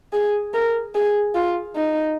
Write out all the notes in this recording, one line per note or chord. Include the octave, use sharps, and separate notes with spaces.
G#4
A#4
G#4
F4
D#4